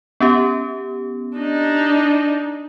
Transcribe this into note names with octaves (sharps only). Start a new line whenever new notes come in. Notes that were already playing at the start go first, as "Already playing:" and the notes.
B3 C#4 G4
D4 D#4